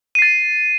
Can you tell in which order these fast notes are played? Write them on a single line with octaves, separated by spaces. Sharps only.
D#7 C7 A6